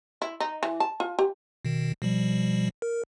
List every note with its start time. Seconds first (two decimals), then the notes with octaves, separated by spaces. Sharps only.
0.22 E4
0.40 D#4
0.63 E3
0.80 A5
1.00 F4
1.19 G4
1.65 B2 D#3
2.02 B2 F3 G3
2.82 A#4